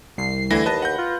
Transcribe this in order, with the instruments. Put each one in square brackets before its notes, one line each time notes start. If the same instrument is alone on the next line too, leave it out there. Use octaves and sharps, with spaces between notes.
[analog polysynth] C2 C7
[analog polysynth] D2 [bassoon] D3 [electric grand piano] E3 E4 A#6
[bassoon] D#2 [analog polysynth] B4 [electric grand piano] D#5 A5
[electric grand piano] F#5 G6
[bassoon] F4